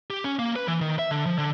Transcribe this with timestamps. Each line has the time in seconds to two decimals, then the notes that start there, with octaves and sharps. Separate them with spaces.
0.10 G4
0.24 C#4
0.39 A#3
0.56 B4
0.68 E3
0.81 D#3
0.99 E5
1.11 D3
1.26 F3
1.38 D3